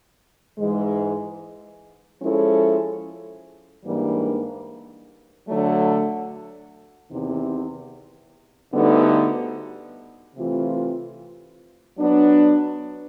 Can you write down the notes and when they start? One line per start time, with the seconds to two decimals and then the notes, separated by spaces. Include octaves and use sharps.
0.58 G#2 E3 G#3
2.21 F3 G#3 C#4 E4 A4
3.84 G#2 E3 G3 A#3 D4
5.47 D3 F#3 A3
7.10 E2 C3 D#3
8.73 D2 D3 G3 B3 D#4
10.36 C3 E3 A3 C4 F4
11.98 F#3 B3 D4